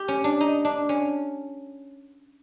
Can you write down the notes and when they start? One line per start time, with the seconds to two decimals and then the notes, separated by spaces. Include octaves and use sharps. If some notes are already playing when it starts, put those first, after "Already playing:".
Already playing: G4
0.08 C#4
0.24 D4
0.41 D#4
0.65 D4
0.89 C#4